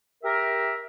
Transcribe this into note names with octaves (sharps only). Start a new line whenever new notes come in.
G4 A#4 E5